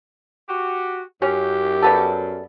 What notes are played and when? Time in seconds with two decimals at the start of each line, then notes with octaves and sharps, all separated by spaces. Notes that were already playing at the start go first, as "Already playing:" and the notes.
0.49 F#4 G4
1.22 F#2 C#4 G4
1.82 G3 B3 A4